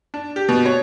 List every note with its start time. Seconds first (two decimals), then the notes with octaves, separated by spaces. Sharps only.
0.14 D4
0.36 G4
0.49 B2
0.66 C#5